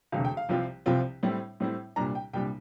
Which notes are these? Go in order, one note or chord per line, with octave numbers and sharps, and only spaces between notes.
E1 D2 C3 F5
G5
F5
C2 C3 F3 C4 F4
C2 C3 F3 C4 F4
A2 G3 C4 E4
A2 G3 C4 E4
C2 A#2 G3 D4 A#5
G5
C2 A#2 G3 D4 G5